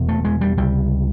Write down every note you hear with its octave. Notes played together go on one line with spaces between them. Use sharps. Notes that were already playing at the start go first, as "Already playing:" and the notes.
Already playing: F1 E2 B2
A3
G#3
G3
C#2 C3 G3